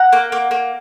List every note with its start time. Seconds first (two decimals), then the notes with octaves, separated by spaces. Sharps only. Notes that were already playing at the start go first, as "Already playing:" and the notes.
Already playing: F#5 A#5
0.13 A#3
0.32 A#3
0.51 A#3